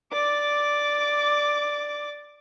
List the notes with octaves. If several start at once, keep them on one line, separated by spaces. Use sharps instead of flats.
D5 D6